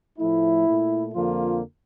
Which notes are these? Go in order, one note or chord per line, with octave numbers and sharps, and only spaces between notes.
A2 F3 A3 E4
A#2 A3
F2 D3 F3 A#3 F4